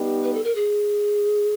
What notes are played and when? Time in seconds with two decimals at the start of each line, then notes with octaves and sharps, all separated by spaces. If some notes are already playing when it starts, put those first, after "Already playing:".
Already playing: G3 B3 D#4 G4
0.23 B4
0.34 A4
0.44 A#4
0.55 G#4